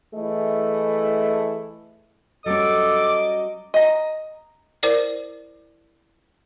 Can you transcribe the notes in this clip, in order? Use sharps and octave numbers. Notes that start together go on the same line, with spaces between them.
E3 A3 E4 G#4 A4 D#5
F#3 G3 C#4 A4 D#5 D6
D#5 A#5
E4 A#4 C5 D5